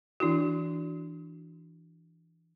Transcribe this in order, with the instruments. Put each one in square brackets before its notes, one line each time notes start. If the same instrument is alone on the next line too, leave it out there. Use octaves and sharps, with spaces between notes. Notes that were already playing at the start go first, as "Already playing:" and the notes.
[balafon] E3 D4 E4 F#4